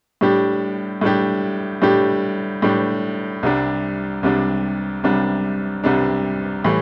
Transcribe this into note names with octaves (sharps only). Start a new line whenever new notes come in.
A2 G3 D4 G4
A2 G3 D4 G4
A2 G3 D4 G4
A2 G3 D4 G4
C2 C3 G3 D4
C2 C3 G3 D4
C2 C3 G3 D4
C2 C3 G3 D4
A2 E3 G3